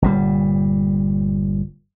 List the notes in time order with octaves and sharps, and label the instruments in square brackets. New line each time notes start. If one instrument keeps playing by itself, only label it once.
[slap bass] G1 A#2 G3